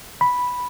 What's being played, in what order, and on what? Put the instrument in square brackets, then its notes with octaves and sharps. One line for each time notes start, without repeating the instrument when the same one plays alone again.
[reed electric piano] B5